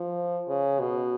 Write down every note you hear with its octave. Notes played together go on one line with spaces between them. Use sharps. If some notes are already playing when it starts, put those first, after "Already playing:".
Already playing: F3
C#3
B2